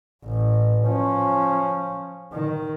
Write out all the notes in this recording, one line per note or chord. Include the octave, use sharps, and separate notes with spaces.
A1
F3 C#4
D#3